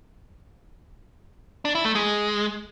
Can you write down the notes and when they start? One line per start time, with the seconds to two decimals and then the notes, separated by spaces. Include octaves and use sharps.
1.65 D4
1.75 E4
1.85 A3
1.95 G#3